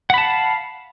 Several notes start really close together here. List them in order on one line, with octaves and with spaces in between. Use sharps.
F#5 B5 A5 F5